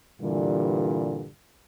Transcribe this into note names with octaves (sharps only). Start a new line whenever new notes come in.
G2 A#2 D3 E3 G3